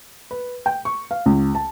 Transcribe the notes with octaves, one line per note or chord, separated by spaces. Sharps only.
B4
G5
C#6
F5
C#2
A5